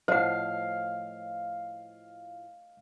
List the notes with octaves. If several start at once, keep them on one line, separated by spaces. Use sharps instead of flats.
A2 F3 C5 D#5 F5 F#5